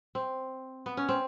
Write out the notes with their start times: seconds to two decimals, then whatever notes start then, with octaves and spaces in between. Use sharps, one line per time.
0.15 C4
0.86 B3
0.97 C#4
1.09 C4